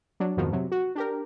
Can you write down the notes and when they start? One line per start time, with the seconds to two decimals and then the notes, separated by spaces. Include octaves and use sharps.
0.20 F#3 D4
0.37 F2 G#2 B2 D#3 F3
0.53 C3 F#3
0.72 F#4
0.95 D4 G4 A#4